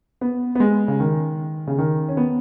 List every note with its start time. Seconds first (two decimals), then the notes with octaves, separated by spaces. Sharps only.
0.21 B3
0.55 B3
0.60 G#3
0.88 C#3
1.00 D#3
1.67 C#3
1.78 D#3
2.09 C#4
2.17 B3